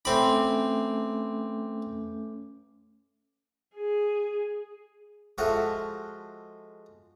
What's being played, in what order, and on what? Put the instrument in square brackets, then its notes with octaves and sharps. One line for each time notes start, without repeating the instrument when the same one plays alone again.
[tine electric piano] A3 C#4 D6 [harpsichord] C4 B5
[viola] G#4
[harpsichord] F3 G#3 F#4 A4 E5 F5